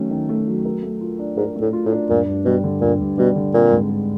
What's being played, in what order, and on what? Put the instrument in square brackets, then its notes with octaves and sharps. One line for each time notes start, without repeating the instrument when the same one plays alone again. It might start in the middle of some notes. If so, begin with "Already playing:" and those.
Already playing: [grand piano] D#3 F#3 A3 C#4
D#3
A3
F#3
A#4
A3
F4
D4
[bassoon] G#2 [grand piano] A#4
[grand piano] A3
[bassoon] A2
[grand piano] F4
[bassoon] A2
[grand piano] D4
[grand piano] G2 [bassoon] A#2
[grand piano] G2
[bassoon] B2 [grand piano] G3
[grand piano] D3
[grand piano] G2 [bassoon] A#2
[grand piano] G2
[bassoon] B2 [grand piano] G3
[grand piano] D3
[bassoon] A#2 [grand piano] C4
[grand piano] G#2
G#3